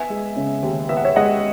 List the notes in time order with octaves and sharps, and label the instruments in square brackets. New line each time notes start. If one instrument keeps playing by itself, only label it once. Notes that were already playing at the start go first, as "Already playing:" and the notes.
Already playing: [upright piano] B3 E5 G#5
G#3
C#3
D#2
B3 E5
F#5
C#5 E5
G#3 D#5 F#5